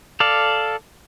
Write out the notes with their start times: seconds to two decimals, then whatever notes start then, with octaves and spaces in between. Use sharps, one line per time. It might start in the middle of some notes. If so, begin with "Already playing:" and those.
0.20 A4 D5 F5